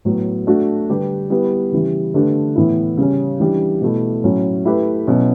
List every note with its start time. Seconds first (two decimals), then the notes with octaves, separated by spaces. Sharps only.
0.05 A2 F#3 B3
0.47 A3 D4 F#4
0.89 D3 G3 D4 G4 B4
1.30 G3 B3 E4 B4
1.72 C#3 E3 G3
2.14 D3 A3 D4 G4 B4
2.56 A2 E3 B3 E4
2.97 C#3 G3 C#4
3.40 E3 G3 D4 G4
3.82 B2 A3 E4
4.24 A2 F#3 C#4 E4
4.65 A3 E4 G4 B4
5.07 B2 F#3 C#4 E4